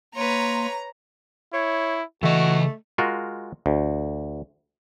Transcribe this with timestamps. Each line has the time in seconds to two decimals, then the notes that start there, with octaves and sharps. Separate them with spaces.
0.16 A#3 B4 C#5 A#5 C6
1.53 E4 C#5
2.23 C#3 E3 A3 F#4 D#5
2.98 G#3 F4 F#4 A#4
3.66 D2